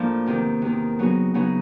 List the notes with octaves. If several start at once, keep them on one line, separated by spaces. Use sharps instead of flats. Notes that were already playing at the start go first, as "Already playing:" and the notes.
Already playing: A2 F3 A#3 D4
E2 C3 D#3
E2 C3 D#3
C#3 F#3 B3 D#4 G#4
C#3 F#3 B3 D#4 G#4